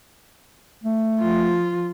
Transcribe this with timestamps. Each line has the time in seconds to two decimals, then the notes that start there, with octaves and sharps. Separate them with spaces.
0.84 A3
1.20 F3 F4